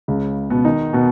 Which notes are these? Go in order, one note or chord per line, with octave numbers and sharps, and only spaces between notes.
C#2 C#3
B2 B3
D#3 D#4
B2 B3